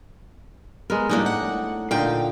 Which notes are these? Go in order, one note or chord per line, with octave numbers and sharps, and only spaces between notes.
G#3 B3 A#4
A2 F3 G3 A#3 D4 D#4
F#5
A#2 D3 D#4 F5 G5